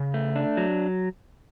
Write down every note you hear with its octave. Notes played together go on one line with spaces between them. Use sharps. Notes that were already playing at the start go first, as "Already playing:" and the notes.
Already playing: C#3
A3
D4
F#3